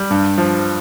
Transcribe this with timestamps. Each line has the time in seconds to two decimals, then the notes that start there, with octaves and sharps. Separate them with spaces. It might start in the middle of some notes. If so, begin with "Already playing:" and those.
Already playing: G3
0.11 G2
0.38 F3